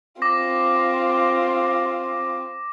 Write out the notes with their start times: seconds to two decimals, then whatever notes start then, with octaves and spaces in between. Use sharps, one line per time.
0.22 C4 F4 D6 A#6